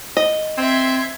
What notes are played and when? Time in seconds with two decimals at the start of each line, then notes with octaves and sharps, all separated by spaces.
0.17 D#5
0.57 C4 E5 C6 G#6